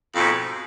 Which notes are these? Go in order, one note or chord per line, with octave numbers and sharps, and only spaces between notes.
F2 G#2 B2